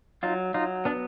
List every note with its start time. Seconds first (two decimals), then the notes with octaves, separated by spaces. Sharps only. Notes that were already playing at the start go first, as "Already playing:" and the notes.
0.23 F#3 D#4 F4
0.54 F#3 D#4 F4
0.85 B3 D4